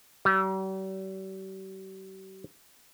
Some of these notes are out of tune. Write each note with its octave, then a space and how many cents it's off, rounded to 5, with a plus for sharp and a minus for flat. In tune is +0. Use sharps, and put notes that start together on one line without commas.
G3 -45